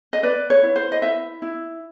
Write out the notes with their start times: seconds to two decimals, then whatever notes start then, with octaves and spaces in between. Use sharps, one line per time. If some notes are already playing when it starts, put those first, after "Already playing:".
0.13 D#5
0.23 B4 D5
0.50 C#5
0.63 E4
0.76 C5
0.92 D#5
1.02 E4 E5
1.42 E4